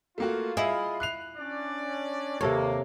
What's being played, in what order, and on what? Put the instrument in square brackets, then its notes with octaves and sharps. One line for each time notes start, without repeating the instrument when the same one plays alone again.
[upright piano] A3 A#3 F#4 [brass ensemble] F4
[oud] E4 [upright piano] G#4 D#5 F5
[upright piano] F#6 C7 F7
[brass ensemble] C#4 D4 D5
[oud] D#2 [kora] C3 A4 C#5 [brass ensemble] A#3